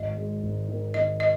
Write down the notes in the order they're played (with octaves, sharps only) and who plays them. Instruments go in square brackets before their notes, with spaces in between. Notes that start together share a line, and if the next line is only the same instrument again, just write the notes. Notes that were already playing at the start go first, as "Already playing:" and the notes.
Already playing: [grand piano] G#1 [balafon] D#5
[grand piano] G#3
G#1
D#3
[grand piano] D#3 [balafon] D#5
[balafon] D#5